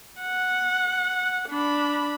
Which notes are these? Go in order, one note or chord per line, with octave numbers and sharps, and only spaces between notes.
F#5
D4 B5